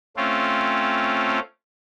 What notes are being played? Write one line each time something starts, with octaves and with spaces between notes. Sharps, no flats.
A3 C4 C#4 F4